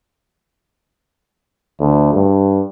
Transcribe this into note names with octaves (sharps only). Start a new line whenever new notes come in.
D2
G2